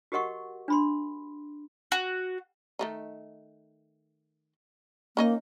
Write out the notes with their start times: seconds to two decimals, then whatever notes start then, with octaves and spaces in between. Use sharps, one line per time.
0.12 F#4 G4 A#4 D#5 F#5 C#6
0.68 D4 B5 C6
1.92 F#4
2.79 D#3 A3 D#4
5.17 A#3 C#4 D#4 D#5